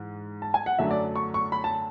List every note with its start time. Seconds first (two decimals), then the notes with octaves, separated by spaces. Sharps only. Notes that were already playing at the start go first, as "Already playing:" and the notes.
Already playing: G#2 E3 G#3
0.42 A5
0.54 G#5
0.66 F#5
0.79 F#2 D3 F#3 A3 D4 E5
0.91 D5
1.16 C#6
1.34 C#6
1.52 B5
1.64 A5